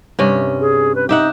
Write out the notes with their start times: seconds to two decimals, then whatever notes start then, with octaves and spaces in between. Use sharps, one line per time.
0.19 G2 C3 C#4
0.60 G#4
0.95 B4
1.09 D#4 G4 E5 F#5